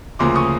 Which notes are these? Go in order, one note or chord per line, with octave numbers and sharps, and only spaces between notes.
D2 C#3 F3 A#3 C6 D6
C#6 D#6